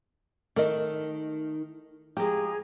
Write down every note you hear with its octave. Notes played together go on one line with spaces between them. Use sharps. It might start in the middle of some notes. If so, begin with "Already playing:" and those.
D#3 A3 A#4 D#5
F3 G#3 G4 G#4 A#5